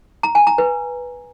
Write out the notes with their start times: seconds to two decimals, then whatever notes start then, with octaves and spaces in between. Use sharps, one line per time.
0.23 A#5
0.35 G#5
0.47 A#5
0.58 B4